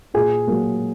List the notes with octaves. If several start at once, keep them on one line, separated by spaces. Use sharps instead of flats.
A#2 G#4
F#3 A#3